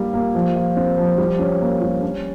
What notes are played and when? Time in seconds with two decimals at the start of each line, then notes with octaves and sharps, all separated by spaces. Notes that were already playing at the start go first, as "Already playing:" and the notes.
Already playing: G3 A#3 F4
0.14 A#3
0.35 F3
0.56 F4
0.77 C4
0.97 F3
1.18 G3
1.39 C#4
1.61 A#3
1.81 G3
2.03 C#4